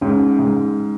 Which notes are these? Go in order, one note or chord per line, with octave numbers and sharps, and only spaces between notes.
G#2 C#4
G#2